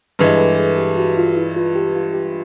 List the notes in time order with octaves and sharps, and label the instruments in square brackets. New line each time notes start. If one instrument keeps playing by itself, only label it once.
[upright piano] G2 E3 G#3 [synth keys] G#4
[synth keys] G#4
A4
G#4
G4
F#4
F4
E4
F4
G4
F4
G4